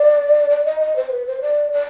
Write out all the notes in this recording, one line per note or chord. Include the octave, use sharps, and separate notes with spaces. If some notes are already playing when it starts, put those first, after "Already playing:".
Already playing: D5
D5
D#5
D#5
C5
B4
C5
D5
D5